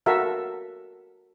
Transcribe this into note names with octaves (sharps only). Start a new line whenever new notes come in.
F#4 A4 A#4 E5 F5